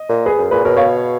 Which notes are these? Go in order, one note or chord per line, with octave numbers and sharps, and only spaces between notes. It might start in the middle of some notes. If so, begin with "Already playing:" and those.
Already playing: D#5
A#2
G#4 B4
F#2
A#2 G#4 B4
B2 A#4 C#5
C#5 F5